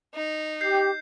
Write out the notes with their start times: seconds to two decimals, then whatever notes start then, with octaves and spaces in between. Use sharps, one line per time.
0.15 D#4
0.61 G4 G6 C7